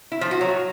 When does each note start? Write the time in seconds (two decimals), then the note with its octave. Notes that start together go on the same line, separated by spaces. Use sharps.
0.12 E4
0.21 F3
0.31 F#4
0.41 F#3